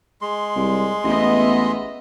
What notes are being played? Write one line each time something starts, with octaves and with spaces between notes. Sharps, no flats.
G#3 C6
C2
A1 B3 D#5 E5